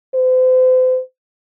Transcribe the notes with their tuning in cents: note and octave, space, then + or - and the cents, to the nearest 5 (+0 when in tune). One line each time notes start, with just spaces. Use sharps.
C5 -40